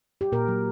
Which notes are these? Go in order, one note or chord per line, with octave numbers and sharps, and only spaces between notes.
G4
A#2 A#4
F#3